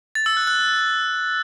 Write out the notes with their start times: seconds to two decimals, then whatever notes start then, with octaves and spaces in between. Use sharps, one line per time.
0.15 A6
0.26 E6
0.37 F#6
0.47 F#6